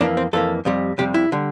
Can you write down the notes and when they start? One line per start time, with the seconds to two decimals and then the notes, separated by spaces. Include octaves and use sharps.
0.01 F2 E3 A#3 D4
0.17 C4
0.33 F2 E3 A#3 A4
0.65 F2 C3 G3
0.98 F2 C3 G3 G4
1.14 E4
1.32 D3 G3